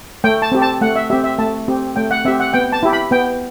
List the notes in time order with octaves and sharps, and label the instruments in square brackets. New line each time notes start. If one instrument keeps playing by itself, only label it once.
[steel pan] A3 G5
A5
C4 G4
A5
A3 F#5
E5
C4 G4 E5
E5
A3 A5
C4 G4
A3 G5
F#5
C4 G4 E5
F#5
B3 G5
A5
E4 G4
B5
B3 G5